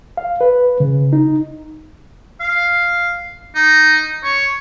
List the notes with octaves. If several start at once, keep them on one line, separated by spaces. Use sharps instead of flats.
F5
B4
C#3
D#4
F5
D#4
C#5